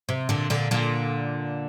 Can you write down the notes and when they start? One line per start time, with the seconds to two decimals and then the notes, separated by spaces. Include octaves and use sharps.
0.09 C3
0.29 A#2 D3
0.50 A#2 D3
0.71 A#2 D3